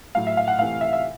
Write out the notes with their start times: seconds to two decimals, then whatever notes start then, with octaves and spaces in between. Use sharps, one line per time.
0.15 A2 F#3 A3 F5
0.27 E5
0.37 F5
0.48 F#5
0.59 C3 E3 A3 F5
0.81 E5
0.93 E5